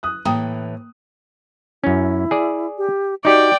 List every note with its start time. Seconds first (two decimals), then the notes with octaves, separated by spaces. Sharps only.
0.03 D#6 F#6
0.25 A2 E3 A#3 G5 A#5 D#6
1.84 F#2 C#4 E4
2.31 G#4 D5
2.78 G4
3.25 D#4 F#4 G4 D5 G5